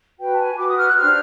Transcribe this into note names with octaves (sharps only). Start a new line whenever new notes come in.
F#4 B4 G5
A5
G#5
F#4 B4 D6
D#6
F6
F#6
D4 G4 C5 F6